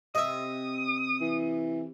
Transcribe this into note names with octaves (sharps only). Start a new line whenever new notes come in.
C3 D#5 E5 D#6
E3